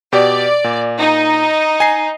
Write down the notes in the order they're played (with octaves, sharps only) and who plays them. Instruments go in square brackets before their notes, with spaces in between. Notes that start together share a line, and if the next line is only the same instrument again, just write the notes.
[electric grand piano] B2 G4 [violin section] D5
[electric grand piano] A#2
[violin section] D#4
[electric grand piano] G#5 C7